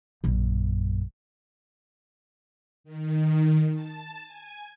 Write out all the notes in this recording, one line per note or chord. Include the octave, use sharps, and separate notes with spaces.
A#1 F#2
D#3
A5
G#5